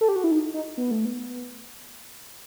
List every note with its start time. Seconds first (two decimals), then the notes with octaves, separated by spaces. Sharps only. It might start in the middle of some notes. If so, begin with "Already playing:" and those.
0.01 A4
0.09 G4
0.16 F#4
0.24 E4
0.31 D#4
0.54 D#4
0.77 B3
0.91 A3
1.05 B3